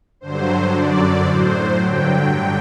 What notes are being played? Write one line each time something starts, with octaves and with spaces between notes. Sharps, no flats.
G2 D3 F#3 C5
F#2 D3 F#3 D5
A2 F#3 C5
G2 D3 F#3 G5